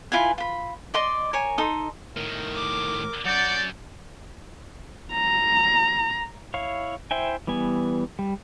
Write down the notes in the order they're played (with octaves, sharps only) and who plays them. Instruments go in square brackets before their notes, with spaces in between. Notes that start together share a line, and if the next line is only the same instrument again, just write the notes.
[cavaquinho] E4 F4 B4 G#5
F4 B5
D5 D#5 C6
A#4 C#5 G#5
D#4 A4 C6 D#6
[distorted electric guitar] A2 D#3 [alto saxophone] A#4
[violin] D6
[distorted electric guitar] F#3 C#4 [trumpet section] D5 [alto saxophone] F#5 [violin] G6
[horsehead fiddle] A#5
[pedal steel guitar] E4 C#5 F5
E4 C5 E5 G5 G#5
E3 G3 B3 G#5
G3